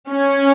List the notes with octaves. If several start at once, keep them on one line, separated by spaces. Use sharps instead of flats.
C#4